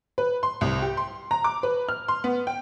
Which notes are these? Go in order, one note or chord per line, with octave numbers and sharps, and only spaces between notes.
B4
C6
C2
G4
C6
A#5
D6
B4
F6
C6
B3
G5